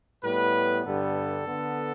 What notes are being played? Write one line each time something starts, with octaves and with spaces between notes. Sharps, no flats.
A2 G3 B3 B4
G2 D3 G3 B3 A4
D3 B3